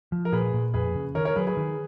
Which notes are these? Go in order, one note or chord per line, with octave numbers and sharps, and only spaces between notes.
F3
A#4
A#2 G#4 B4
A#2
F2 G#4 B4
C#3
D#3 A#4 C#5
A#4 C#5
F#3 G#4 B4
G#4 B4
D#3